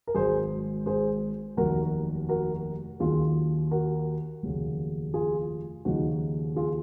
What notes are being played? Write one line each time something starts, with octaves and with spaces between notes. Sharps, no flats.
A#4
G#1 G#2 F#3 G#4 C5
G#4 C5
F1 D#2 D#3 F#3 F#4 A#4
F#4 A#4
D#2 D#3 F#3 F4 G#4
F#4 A#4
F1 D#2 C#3 F#3
F4 G#4
D#2 C#3 F3 D#4 F#4
F4 G#4